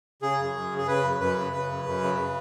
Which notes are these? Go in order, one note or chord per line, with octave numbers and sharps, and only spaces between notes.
C#3 G#4
F#2
F#2
C#3
G#4
C#3 B4
F#2
F#2 B4
C#3
C#3 B4
F#2
F#2
C#3
C#3